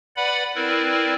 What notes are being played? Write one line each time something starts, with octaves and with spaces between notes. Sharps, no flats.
B4 D5 F#5 B5
C4 E4 A#4 B4 D5